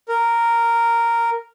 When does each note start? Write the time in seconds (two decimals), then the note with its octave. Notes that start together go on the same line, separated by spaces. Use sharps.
0.08 A#4